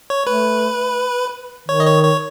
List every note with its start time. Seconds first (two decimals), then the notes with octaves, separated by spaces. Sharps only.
0.10 C#5
0.27 A3 B4
1.69 D#3 C#5
1.80 D#5
1.87 C#5
2.04 C#5